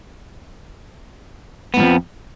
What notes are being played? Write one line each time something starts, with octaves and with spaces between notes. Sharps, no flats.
F2 G#2 F3 B3